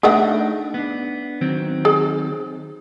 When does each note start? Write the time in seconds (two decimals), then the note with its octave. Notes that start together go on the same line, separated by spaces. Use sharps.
0.03 A3 D4 D#4 G#4 E5 F#5
0.74 B3 D4
1.41 D#3 F#3 C4
1.85 G#4